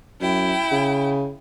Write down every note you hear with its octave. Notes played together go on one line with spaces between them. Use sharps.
F#2 E4 G5
C#3